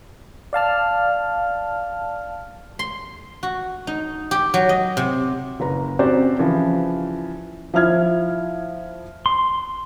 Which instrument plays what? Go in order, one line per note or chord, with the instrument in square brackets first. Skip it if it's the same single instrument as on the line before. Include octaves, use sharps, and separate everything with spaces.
[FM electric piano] D5 F5 A5 F6
[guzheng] C6
F#4
D#4
G4
F#3
D#5
C3
[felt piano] F#1 B4 A#5
C4 C#4 F#4 G4 C5 D5
C#3 E3 F3
F3 E4 F6 G#6
[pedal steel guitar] C6